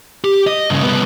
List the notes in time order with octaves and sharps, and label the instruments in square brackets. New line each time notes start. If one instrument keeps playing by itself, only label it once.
[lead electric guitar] G4
D#5
G2 C#3
C2 B3